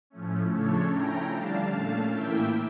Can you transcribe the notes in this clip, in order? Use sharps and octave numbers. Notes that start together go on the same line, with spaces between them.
A2 F3 A3 C#4
C#3 F3 A3 D4 A4 C#5
F3 A3 C#4 E4 G5 A#5
D3 G3 D4 F5 A5
A#2 A3 C#4
A2 E3 A#3 E4 E5 G5